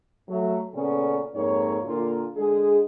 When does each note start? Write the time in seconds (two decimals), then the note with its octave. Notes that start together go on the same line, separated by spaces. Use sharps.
0.29 F#3 A3
0.74 A#2 C#3 B3 C#4 A4 D5
1.35 F2 G#2 A#3 C#5
1.84 A#2 D3 A#3 F4
2.36 D3 G#3 G#4